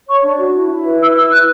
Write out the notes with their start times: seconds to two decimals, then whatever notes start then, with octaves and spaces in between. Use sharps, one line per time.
0.08 C#5 C#6
0.24 D4
0.39 F#4
0.54 E4
0.69 E4
0.85 B4
1.01 E4 E6
1.16 B4 E6
1.31 E4 F#6